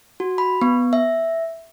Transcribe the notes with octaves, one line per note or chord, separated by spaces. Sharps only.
F#4
B5
B3
E5